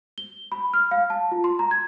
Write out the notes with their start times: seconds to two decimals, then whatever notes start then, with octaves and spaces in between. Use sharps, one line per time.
0.18 G7
0.52 B5
0.74 F6
0.91 F5
1.10 A5
1.32 F4
1.44 C6
1.59 A#5
1.71 G#6